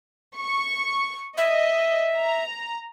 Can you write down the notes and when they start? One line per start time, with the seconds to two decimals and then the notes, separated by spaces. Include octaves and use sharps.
0.37 C#6
1.37 D#5 E5
2.17 A#5